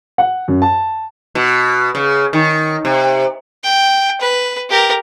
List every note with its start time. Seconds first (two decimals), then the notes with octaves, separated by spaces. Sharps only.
0.18 F#5
0.48 F#2
0.62 A5
1.35 B2
1.95 C#3
2.33 D#3
2.85 C3
3.63 G5
4.21 B4
4.70 G4 A#4